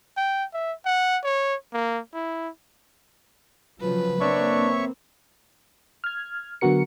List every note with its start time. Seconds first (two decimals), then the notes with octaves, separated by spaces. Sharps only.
0.17 G5
0.54 E5
0.86 F#5
1.24 C#5
1.73 A#3
2.14 E4
3.81 C#3 F3 F#3 B4
4.21 A#3 C4 D4 C#5 E5 C#6
6.04 F6 G#6
6.61 D3 F#3 B3 F#4 A#4 C#7